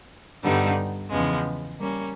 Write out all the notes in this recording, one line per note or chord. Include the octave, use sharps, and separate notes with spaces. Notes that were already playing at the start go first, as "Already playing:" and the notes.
G2 D3 G3 B3 D#4
E2 C#3 F3 G#3 B3
G3 A#3 C#4